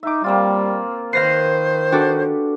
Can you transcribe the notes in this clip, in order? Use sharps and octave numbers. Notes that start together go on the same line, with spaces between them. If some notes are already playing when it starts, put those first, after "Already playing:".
D#4 E5 D6
G3 A#3 C4 F4
D#3 B4 C5 F5 A#6 C7
D4 F#4 G4 A4